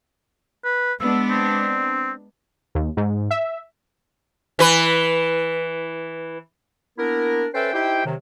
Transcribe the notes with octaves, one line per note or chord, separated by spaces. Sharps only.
B4
G#3 B3 D4 E6
C4
D#2
G#2
E5
E3 B4
A#3 B3 D4 E4 A#4
C#4 A4 B4 C5 E5 G5
D#4 E4 G4 C5 E5 G5
C3 D#3 F#3